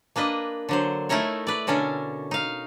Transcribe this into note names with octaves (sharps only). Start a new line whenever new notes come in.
A#3 D4 B4 D#5
D3 F#3 C5
A3 D#4 E4 A#4 C#5
B4 D5
B2 D3 C#4 A4 A#4
D#4 F5